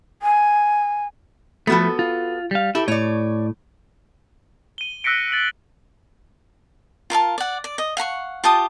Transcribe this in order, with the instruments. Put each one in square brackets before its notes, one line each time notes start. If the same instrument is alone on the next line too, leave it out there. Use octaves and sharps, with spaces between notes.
[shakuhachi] G#5
[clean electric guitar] F3 A3 [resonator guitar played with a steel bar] B3 F#4 A4
[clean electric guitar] F4
G3 F5
[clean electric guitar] E4 [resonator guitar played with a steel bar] G4 A4
[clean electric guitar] A2 [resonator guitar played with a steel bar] C#5 D5
[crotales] D#7 G7
E6 F#6 A#6 B6 C#7 D7
A6 F#7
[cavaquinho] F4 A#4 F5 A5
D5 F#5
D5
D#5
F5 F#5 A#5 C#6
F4 G4 A5 D#6